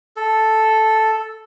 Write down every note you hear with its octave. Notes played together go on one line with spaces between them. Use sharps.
A4